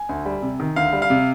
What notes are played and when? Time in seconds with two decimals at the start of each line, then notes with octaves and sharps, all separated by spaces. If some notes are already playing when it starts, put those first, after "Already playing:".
Already playing: G#5
0.09 D2
0.26 G3
0.42 C3
0.60 D#3
0.76 D2 F5
0.93 G3
1.02 F5
1.10 C3